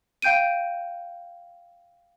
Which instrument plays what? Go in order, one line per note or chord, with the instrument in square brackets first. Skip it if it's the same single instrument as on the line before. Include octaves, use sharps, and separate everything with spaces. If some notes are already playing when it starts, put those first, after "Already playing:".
[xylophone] F5 G5 G6 D7 D#7